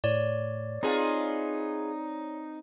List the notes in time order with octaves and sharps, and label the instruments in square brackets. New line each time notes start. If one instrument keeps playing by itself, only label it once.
[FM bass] A2 [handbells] C#5 D5
[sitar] B3 F4 G#4 [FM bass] C4 [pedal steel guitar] D#4